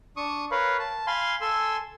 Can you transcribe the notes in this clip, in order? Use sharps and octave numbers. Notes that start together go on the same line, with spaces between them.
D4 C#6 D#6
A#4 B4 C#5 F5 B5
A5
F5 G#5 B5 C6
A4 G#5 C6 E6